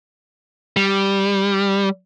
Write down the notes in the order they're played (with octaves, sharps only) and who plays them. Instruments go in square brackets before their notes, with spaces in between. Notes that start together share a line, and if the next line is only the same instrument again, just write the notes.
[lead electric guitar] G3